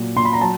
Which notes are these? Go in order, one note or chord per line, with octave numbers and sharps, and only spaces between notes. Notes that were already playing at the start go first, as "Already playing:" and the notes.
Already playing: A#2 F#3
A#2 C6
B5
A#5
F#3 A5